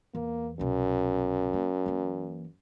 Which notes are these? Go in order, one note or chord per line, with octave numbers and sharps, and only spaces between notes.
E2 A#3
C2 F#2 B2
A#3
E3 A#3